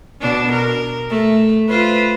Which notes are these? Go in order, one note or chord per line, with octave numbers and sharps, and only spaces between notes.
B2 D4
A#4
A3
F4 B4 C5